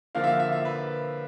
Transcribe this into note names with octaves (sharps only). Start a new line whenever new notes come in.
D3 F3 A#3 F5
E5
F5
E5
E5
B4